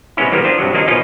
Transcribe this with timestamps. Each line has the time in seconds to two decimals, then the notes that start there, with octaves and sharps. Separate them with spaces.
0.17 C3 G#3 B3 C#4 E4
0.31 A#2 E3 F3 G3 A#3 B3
0.44 F3 D4 F4 G4 C5
0.58 G2 C3 F#3
0.73 D#3 F3 A#3 D4 D#4
0.88 B2 F3 C#4 D#4 F4 A#4